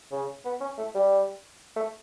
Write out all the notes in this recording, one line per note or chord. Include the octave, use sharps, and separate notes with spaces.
C#3
B3
C#4
A3
G3
A3